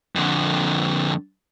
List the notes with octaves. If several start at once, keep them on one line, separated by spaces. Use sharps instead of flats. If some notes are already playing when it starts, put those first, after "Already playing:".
F2 D3